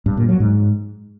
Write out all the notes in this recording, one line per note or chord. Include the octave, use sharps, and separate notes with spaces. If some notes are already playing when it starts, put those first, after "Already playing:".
G2
A#2
F#3
G#2